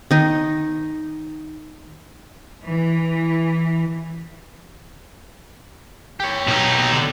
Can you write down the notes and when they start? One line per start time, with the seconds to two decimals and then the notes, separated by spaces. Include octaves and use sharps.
0.11 D#3 D#4
2.67 E3
6.20 G4 C#5
6.48 B1 D#4
6.92 D3